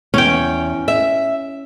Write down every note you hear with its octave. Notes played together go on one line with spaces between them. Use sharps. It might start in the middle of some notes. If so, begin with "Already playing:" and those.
E2 C#4 G5
E5